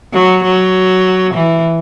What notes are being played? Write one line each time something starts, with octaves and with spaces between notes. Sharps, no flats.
F#3
F#3
E3